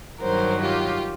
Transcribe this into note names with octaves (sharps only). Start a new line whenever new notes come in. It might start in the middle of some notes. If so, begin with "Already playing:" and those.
G2 D#3 F#3 A#4 C5
F4 G4